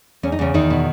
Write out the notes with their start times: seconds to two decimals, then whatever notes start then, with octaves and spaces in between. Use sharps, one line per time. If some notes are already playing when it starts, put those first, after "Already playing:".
0.23 E2 C#4
0.32 D#4
0.39 E2 C#3 C#4
0.54 E2 D#3 D#4
0.70 B2